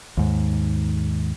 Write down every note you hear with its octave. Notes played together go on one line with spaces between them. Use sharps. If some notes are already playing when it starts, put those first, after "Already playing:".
D#2 G#2